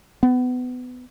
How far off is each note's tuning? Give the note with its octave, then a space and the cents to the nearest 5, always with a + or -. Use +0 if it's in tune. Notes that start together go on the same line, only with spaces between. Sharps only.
B3 +25